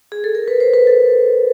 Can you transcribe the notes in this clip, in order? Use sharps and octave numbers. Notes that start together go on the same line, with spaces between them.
G#4
A4
A#4
B4
C5
B4
A4